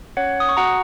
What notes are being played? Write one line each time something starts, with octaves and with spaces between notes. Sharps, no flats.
C#4 C#5 F#5
D#6
C#6
F#4 F#5 A#5